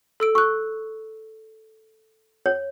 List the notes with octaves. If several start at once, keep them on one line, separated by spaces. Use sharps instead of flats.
A4 E6 D7
C#6 E6 F#6
C#5